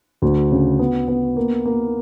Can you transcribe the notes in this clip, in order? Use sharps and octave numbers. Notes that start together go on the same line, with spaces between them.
D2
C#3
B3
B3
A#3
A#3